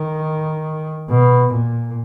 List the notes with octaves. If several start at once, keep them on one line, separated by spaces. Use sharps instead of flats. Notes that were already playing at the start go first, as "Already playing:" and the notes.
Already playing: D#3
B2
A#2